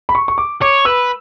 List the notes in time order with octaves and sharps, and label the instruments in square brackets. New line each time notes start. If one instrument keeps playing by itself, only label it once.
[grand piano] B5
C#6
C#6
D6
[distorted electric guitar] C#5 [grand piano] D6
[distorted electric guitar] B4 [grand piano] E6